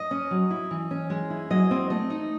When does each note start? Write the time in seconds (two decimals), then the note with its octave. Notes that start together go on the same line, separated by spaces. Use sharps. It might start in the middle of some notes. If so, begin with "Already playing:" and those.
Already playing: D#5
0.11 C#4
0.31 F#3
0.50 E4
0.71 E3
0.91 C#4
1.10 G#3
1.30 E4
1.50 F#3 D#5
1.71 C4
1.90 A3 D#5
2.10 D#4